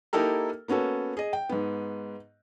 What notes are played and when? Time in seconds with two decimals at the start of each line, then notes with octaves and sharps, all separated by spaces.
0.13 A#3 D#4 E4 G4 A4 A#4
0.68 A#3 B3 C#4 F#4 A4
1.17 G#4 D#5
1.33 G5
1.49 G#2 B3